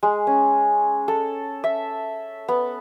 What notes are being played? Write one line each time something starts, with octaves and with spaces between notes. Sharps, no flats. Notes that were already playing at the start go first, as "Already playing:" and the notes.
G#3
C#4
A4
E5
B3